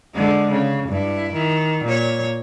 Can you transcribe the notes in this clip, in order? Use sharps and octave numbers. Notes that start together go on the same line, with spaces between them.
D3 G#3
C#3
G2 E4
D#3
A#2 C#5